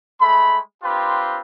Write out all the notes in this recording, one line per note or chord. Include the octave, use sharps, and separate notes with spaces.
G#3 A3 B5
C4 D4 F4 G4 B4